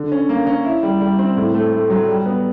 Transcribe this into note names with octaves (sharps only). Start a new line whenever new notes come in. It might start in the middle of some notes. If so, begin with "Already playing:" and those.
Already playing: D3
C#4
A#3
C#4
E4
G3
G3
C4
A2
A3
A3
F#3
G3
B3